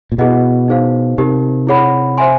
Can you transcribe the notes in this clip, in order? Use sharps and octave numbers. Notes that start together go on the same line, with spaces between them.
A#2
B2 E4 G#4 B4 D#5 F#5
D#4 G#4 C5 F5
C3 D#4 G4 A#4
E4 G#4 C#5 F#5 B5
C5 E5 G#5 C6